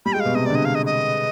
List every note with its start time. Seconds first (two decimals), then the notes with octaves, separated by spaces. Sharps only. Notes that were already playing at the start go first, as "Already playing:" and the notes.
0.06 G3 B5
0.13 G#3 G5
0.20 F5
0.25 B2
0.35 C3 D#5
0.46 D3 D5
0.55 D#5
0.65 F5
0.75 D#5
0.86 D#5